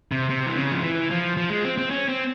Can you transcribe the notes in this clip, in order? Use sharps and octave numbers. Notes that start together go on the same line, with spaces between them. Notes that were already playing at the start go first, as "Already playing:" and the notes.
C3
C3
E3
C#3
F3
E3
F3
F3
G#3
C4
C4
C#4
C4